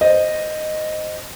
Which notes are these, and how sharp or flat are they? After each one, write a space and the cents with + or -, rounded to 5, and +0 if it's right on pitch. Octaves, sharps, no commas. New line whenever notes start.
C5 +0 D#5 -10